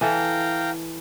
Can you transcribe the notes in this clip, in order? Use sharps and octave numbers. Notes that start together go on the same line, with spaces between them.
E3 A4 F5 G5 A#5